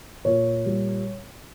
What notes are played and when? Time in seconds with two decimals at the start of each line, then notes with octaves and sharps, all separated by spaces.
0.25 A#2 C#5
0.66 G3